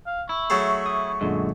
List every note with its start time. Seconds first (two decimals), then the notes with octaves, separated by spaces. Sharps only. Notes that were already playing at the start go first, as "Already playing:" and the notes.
0.07 F5
0.29 E4 C#6
0.50 F#3 A3 G#4
0.86 D#6
1.21 F#2 A#2 D3 G#3